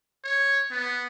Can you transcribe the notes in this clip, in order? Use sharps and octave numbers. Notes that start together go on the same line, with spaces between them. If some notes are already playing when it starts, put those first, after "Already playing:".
C#5
B3